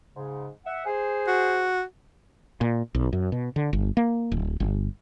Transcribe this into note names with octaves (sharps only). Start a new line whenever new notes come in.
G#2 C#3
E5 F#5
G#4 C5
F#4
A#2
B1
F#2
B2
D3
G1
A#3
D1
G1